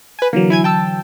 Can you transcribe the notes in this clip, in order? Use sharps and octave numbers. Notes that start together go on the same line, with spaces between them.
B4 G#5
D3 E3 F#3 A#3
E4 G#5 G#6
G5 A5 E6